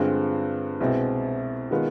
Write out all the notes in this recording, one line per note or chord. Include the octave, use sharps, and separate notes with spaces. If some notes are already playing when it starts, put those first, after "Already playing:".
Already playing: G2 D3 G#3 C4 F4
C2 B2 G#3 C4
D#3 G#3 B3 F4